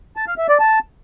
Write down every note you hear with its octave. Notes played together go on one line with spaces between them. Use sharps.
A5
F5
E5
D5
A5